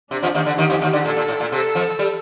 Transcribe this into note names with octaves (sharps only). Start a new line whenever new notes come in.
C3 D4
F2 F3
D#2 D#3
D3
D#2 D#3 G4
F2 F3
D#2 D#3
D3
A#2 A4
A#2
A2
A#2
C3 A4
F2 F3
G3